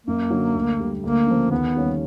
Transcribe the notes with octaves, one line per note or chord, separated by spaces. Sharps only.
F#2 A#3
D3 F#3
D2
D3 G3
D2 A#3
C#3 F3
D#2 B3
D#3 G3 A#3 C#4